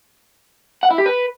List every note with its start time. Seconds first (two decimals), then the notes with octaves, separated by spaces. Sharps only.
0.83 F#5
0.91 E4
0.98 G4
1.06 B4